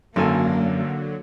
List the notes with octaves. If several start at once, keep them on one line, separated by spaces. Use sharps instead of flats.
G#1 F#2 D3 F#3 A#3 A4 G#5